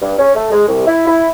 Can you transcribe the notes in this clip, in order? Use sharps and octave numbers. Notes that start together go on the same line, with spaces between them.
G2
C#4
A3
G#3
C2
E4
E4